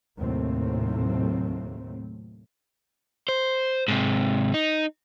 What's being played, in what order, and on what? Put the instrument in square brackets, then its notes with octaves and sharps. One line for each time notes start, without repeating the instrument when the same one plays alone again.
[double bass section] D#2 A2 C3 F#3 A3 C4
[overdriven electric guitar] C5
G#2 C3
D#4